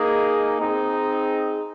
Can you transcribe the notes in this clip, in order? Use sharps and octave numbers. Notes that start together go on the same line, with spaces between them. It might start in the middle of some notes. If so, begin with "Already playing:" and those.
Already playing: A#3 D#4 G#4 D#5
C4 D#4 G#4